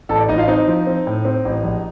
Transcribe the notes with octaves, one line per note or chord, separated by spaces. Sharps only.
A1 A4 A5
D5
A1 D#4 D#5
F4 F5
C4 D#4 D#5
F3
C4
A2
C4
A1
A#1